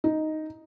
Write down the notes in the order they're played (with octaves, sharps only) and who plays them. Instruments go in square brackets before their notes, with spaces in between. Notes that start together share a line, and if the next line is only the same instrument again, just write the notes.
[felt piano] D#4